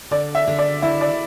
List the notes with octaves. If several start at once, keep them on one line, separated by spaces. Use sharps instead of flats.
D3 D5
E5
D3
D5
E4 E5
D5